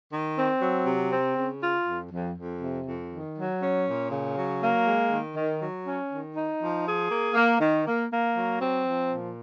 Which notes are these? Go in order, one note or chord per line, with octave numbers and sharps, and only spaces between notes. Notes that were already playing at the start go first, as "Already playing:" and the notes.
D#3
C4
F#3
C3
C4
C#3
F4
F2
F2
F2
C3
F2
D#3
F#3
C#4
A#2
C#3
F#3
A#3
G#3
D#3
D#3
F#3
C#4
D#3
D#4
F3
G#4
A#3
A#3
D#3
A#3
A#3
F#3
C4
F3
A#2